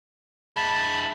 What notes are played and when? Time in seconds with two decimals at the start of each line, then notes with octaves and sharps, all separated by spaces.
0.57 G#3 E4 A5 B5